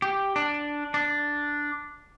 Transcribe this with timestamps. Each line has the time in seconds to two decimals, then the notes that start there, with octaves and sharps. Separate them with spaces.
0.02 G4
0.36 D4
0.94 D4